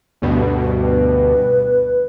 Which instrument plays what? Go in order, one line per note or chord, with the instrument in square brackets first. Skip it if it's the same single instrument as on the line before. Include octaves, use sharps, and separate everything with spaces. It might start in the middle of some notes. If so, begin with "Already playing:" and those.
[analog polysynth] D2 G2 B2
[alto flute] B4